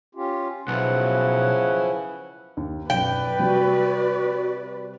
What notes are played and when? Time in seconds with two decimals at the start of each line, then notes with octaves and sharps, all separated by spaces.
0.15 C#4 F4 G4
0.68 B1 C#3 F3 E4 B4 F#5
2.57 D#2
2.90 B1 F#2 B4 D5 G5
3.39 C3 G3 F#4